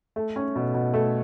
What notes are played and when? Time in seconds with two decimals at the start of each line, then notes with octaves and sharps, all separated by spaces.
0.16 A3
0.36 C#4
0.56 B2
0.74 B2
0.94 A3